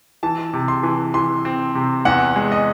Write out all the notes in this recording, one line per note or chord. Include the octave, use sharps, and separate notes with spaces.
E3 A5
C3
C6
E3
E3 C6
C4
C3
E2 F#5
G#3
D#5